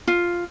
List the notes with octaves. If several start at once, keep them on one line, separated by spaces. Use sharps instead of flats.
F4